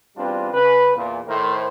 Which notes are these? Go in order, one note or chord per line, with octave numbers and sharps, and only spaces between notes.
E2 G3 C4 D4 F4 B4
C#3 B4
E2 A#2
A2 D#3 A3 A#4 C5